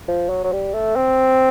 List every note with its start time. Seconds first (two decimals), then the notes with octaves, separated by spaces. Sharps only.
0.08 F3
0.29 F#3
0.43 F#3
0.52 G3
0.74 A3
0.96 C4